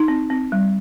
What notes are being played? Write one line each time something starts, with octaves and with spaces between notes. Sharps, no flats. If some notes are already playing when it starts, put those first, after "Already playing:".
Already playing: D#4
C4
C4
G3